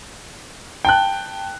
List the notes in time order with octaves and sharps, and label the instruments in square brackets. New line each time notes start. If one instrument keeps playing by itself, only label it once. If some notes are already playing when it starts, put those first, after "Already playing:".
[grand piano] G5 A5 F#6